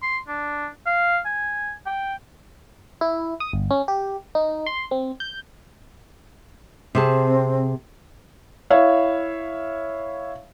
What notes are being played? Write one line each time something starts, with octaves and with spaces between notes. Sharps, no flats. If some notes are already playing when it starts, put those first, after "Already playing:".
C6
D4
F5
G#5
G5
E4
D#6
G1
C#4
G4
D#4
C6
C4
G6
C3 C4 G#4 A5
E4 C#5 E5 F5